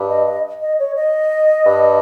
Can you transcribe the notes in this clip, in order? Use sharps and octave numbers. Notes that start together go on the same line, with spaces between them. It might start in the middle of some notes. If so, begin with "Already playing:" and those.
Already playing: G2
D#5
D#5
D#5
C#5
D#5
G2